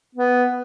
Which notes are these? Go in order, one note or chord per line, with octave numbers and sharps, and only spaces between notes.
B3